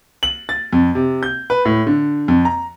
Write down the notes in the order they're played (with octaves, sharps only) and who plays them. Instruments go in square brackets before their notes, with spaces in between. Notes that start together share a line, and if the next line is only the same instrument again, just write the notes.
[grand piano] F#7
A6
F2
C3
G6
B4
A2
D3
F2
A#5